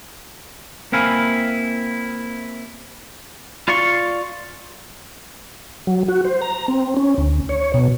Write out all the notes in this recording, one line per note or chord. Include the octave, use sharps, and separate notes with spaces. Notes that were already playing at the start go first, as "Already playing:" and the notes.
A#3 C4 E4 F5 G#5 B5
F4 D5 F5 C6 C#6
F#3
F#4
C5
A#5
C4
C#4
D2
C#5
B2